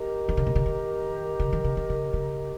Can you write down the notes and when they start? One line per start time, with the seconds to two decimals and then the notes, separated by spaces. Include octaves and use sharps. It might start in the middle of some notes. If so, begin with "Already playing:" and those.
Already playing: G4 A#4 D#5 A#5
0.29 D#3
0.37 C#3
0.47 C3
0.56 C#3
0.66 D#3
1.40 C#3
1.53 D#3
1.64 C#3
1.77 D#3
1.90 C#3
2.13 C#3